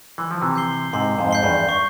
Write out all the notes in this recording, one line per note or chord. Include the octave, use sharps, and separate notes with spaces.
E3 C6
F3
C3 E3
G6 C7 G7
G#2 C3 C6
F2 G#2
G6 C7 G7
E2 G2
C#6